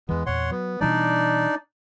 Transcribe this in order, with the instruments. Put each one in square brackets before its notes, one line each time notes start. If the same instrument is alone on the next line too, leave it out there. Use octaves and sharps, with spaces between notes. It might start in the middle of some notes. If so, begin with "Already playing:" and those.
[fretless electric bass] E2 E3 [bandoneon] G#3 B3
[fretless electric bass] E2 A#2 [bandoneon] C#5 F#5 C6
[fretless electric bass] F#3 [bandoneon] B3
[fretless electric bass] B2 E3 G3 [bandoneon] D4 D#4 D5